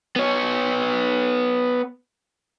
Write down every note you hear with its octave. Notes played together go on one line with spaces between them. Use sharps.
B3 C#5